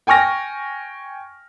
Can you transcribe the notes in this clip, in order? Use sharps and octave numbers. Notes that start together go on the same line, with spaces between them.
G5 G#5 C#6 F6 A#6